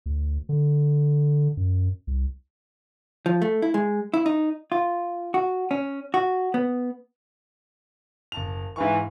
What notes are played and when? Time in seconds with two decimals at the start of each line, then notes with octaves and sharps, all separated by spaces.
0.06 D2
0.49 D3
1.57 F#2
2.07 C2
3.26 F3
3.42 A3
3.62 E4
3.74 G#3
4.14 E4
4.26 D#4
4.72 F4
5.34 F#4
5.71 C#4
6.14 F#4
6.54 B3
8.32 F#1 A5 F7
8.76 G#2 E3 F5 C#6